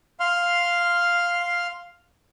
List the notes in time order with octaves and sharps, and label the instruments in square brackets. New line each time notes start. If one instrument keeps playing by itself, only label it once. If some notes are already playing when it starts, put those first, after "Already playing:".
[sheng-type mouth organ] F5 C6 F6